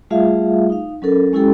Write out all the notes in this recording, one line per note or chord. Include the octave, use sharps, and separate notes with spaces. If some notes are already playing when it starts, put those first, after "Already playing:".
G3 A3 F4 G#4 E5 F5
D#4 F5
F#3 C#4 A4 A#4
G#3 C#4 E4 G4 A4 G5